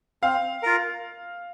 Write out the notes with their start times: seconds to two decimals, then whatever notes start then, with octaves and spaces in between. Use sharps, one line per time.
0.23 C4 F5
0.63 F4 A#4